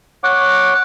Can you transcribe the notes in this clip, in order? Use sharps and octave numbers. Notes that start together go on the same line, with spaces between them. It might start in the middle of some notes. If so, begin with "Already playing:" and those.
C#5 F#5 D6